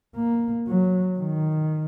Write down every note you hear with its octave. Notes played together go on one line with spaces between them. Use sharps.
A#3
F#3
D#3